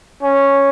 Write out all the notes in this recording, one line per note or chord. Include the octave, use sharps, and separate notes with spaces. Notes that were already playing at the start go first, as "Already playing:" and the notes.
C#4